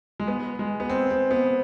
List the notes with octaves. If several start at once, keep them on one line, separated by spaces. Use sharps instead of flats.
G#3
B3
G#3
B3
C4
C4
B3